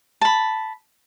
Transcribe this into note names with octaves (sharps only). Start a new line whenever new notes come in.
A5 B5